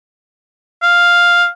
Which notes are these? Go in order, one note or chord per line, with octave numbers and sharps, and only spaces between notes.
F5